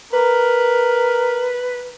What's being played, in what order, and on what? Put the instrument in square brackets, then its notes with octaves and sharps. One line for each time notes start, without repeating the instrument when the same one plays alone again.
[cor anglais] A#4 [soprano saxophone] B4